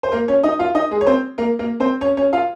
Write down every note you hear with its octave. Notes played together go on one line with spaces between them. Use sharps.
C5
A#3 A#4
C#4 C#5
D#4 D#5
F4 F5
D#4 D#5
G#3 G#4
C#5
C4 C5
A#3 A#4
A#3 A#4
C4 C5
C#4 C#5
C#4 C#5
F4 F5